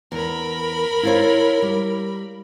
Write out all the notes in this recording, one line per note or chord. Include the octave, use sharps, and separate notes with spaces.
E2 A#4 B5
E4 F4 C#5
G3